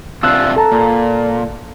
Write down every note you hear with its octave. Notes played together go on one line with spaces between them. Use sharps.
C3 D4 F4 E6 F#6
A4 A5 A#5
A#2